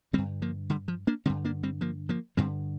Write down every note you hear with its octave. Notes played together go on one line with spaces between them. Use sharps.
G2 D3 G3 C4
F3 A#3
D3 G3
F3
A#3 D4
G2 D3 G3 C4
A#3 D4
G3 C4
F3 A#3
F3 A#3
G2 D3 G3 C4